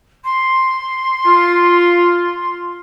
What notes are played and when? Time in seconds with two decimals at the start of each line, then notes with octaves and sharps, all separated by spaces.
0.24 C6
1.26 F4